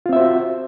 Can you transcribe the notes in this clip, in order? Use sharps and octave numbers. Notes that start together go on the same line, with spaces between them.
C4 F4 F#4 C5 E5